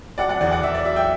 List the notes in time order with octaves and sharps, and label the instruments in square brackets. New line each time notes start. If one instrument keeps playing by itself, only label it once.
[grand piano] F#3 D5 F#5
D5 F#5
E2 D5
D5 F#5
E2 E5
D5
F#3 E5
E5 G5